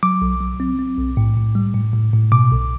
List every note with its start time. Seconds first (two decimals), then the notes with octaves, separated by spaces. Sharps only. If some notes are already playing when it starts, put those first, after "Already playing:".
0.03 F#3 D6
0.22 B1
0.41 F#3
0.60 C4
0.79 C4
0.98 B1
1.17 A2
1.37 A2
1.55 G3
1.75 A2
1.94 A2
2.13 A2
2.32 B2 D6
2.51 B1